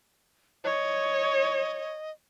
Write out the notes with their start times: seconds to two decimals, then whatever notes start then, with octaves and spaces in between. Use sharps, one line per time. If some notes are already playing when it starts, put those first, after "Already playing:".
0.64 C#5 D#5